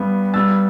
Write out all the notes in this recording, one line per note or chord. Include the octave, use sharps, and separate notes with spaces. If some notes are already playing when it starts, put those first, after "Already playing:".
Already playing: G2 G3 B3
G2 G3 B3 E6 A6